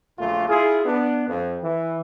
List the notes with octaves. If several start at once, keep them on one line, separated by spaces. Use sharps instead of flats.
A#1 F#2 A#2 D3 A3 F4
E4 F4 G#4
B3 D4
F2
E3